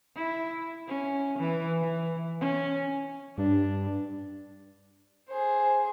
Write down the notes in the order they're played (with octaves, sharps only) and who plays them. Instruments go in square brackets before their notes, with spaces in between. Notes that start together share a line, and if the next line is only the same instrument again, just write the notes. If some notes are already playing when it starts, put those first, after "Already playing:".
[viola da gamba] E4
C#4
E3
E3
C#4
[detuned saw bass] G2 [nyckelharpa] D4
[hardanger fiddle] G#4 C5